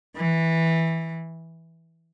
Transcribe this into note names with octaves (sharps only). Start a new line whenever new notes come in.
E3